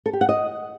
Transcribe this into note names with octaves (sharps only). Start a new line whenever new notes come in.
A4
G4
F#5
D#5